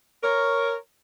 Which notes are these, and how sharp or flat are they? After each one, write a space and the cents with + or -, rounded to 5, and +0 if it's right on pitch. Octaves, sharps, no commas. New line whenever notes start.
A#4 +0 C#5 +0